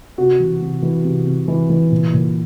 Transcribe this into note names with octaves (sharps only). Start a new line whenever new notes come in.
C3 F#4
E3
C3
E3
C3
C3
E3
E3
A#2
A#2